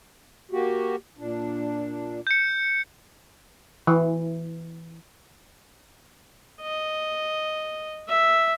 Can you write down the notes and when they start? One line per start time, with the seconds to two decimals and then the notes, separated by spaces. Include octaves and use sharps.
0.51 A#3 F#4 G4
1.18 A#2 D4
2.27 G6 C#7
3.87 E3
6.61 D#5
8.09 E5